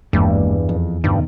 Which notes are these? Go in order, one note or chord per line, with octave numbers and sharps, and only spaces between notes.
G#1 E2 G2 G#3 A#3
F2
D2 G2 B2 D#3